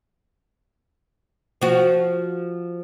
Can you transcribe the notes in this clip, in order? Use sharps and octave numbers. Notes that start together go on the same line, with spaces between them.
F3 F#4